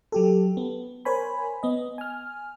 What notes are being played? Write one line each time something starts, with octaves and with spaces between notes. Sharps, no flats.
F#3 G4 A4
B3
A#4 C5 C#5 G#5 B5
B3 D#5
G#5 F6